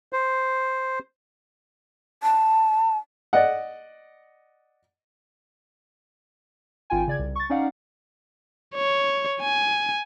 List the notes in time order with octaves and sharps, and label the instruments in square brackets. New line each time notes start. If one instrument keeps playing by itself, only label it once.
[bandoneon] C5
[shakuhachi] A5
[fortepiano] D5 D#5 F#5
[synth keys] G#1 F4 G5 G#5
C#3 D5 G#6
C2
C#6 A6
C#4 D#4 D5 F5 F#5
[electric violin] C#5
G#5